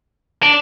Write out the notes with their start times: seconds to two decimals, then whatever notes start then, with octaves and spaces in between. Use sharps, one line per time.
0.43 D4